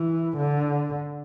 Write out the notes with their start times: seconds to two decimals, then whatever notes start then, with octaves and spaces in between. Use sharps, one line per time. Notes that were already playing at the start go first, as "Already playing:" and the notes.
Already playing: E3
0.38 D3